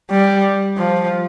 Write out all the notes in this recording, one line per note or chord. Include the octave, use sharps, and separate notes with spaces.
G3
F3